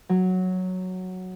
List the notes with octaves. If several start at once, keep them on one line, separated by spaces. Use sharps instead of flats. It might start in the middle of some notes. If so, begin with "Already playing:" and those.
F#3